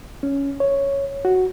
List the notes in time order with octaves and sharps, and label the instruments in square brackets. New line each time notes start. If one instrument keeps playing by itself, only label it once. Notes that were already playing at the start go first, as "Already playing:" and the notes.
[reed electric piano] C#4
C#5
F#4